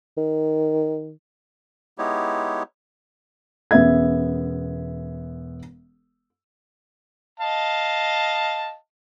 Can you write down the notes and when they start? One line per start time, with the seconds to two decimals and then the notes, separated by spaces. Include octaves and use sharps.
0.17 D#3
1.98 G#3 B3 D#4 E4 G4 C#5
3.71 E1 B3 C#4 E5 G#6
7.40 D#5 F5 A5